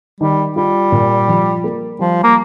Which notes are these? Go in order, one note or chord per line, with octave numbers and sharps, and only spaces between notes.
D#3 G3
G3 F4
A#2
F3
A#3
F3 G3
A#3